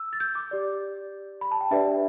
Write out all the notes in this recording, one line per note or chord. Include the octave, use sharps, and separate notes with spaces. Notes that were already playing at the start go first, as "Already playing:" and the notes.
Already playing: E6
A6
G6
D6
G4 D5
B5
A5
G5
D4 G4 B4 D5 E5